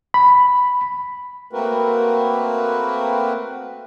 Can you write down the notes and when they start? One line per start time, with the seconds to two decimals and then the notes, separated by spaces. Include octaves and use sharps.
0.14 B5
1.53 A3 A#3 C4 F#4 A#4 B4